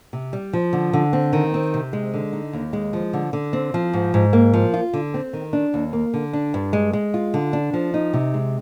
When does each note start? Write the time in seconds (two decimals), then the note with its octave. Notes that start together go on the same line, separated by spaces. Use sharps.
0.13 C3
0.33 G3
0.53 F3
0.73 D3
0.93 D3
1.13 C4
1.33 D#3
1.54 C4
1.74 C3
1.93 G#3
2.14 D3
2.33 D#4
2.53 D#2
2.73 G#3
2.93 F3
3.13 D3
3.33 D3
3.53 C4
3.74 F3
3.93 G#2
4.14 G#2
4.33 A#3
4.53 F3
4.74 F4
4.94 D3
5.14 C4
5.33 D#3
5.53 D4
5.74 D#2
5.93 A#3
6.14 D3
6.33 D4
6.54 G2
6.73 G#3
6.93 G#3
7.14 F4
7.34 D3
7.53 D4
7.73 F3
7.94 D#4
8.13 C3
8.34 G#3